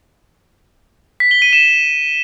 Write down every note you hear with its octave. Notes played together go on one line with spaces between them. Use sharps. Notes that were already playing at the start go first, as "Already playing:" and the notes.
B6
G7
D#7
E7